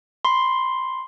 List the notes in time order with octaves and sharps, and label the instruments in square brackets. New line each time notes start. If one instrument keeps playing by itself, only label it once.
[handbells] B5 C6